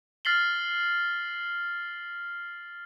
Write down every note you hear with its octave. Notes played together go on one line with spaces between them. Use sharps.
F6 A6 B6 C7 F#7 G7